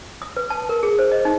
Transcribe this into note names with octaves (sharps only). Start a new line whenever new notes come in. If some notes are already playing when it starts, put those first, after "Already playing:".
D#6
B4
A5
A#4
G#4
C5
D#5
D#4